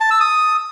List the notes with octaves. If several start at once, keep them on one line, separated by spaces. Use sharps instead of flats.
A5
E6
D#6